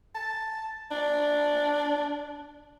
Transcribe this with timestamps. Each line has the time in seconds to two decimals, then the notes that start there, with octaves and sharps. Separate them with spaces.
0.15 A5
0.91 D4